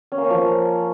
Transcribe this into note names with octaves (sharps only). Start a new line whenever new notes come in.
C#4
A#3
C#4
F3